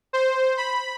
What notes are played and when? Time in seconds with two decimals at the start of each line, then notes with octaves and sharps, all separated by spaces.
0.13 C5
0.57 B5